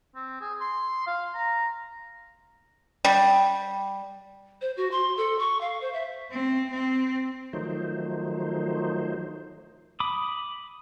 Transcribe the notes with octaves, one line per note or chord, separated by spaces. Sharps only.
C4
G#4
C6
F5
A#5
G3
C5
F#4
C6
A4
C#6
F5
C5
E5
C4
C4
D#3 F3 F#3 A3 D#4 C5
B5 D6 D#6